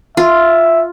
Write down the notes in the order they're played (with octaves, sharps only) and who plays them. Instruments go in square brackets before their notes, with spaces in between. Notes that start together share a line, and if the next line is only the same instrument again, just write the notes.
[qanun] F4 [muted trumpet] E5